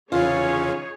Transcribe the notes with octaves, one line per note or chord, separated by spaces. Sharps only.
E2 C#3 E3 C#4 D#4 F4 G#4 C#5